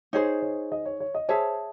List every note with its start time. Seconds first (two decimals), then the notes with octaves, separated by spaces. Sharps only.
0.13 D#4 G#4 C5 C#5
0.42 C#5
0.72 D#5
0.86 C#5
1.00 C#5
1.15 D#5
1.29 G#4 C5 C#5 E5 A5